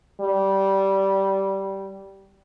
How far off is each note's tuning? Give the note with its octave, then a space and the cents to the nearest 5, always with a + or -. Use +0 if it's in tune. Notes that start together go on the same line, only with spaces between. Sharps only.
G3 -15